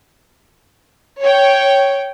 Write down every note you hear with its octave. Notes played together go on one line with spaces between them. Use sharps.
C#5 G5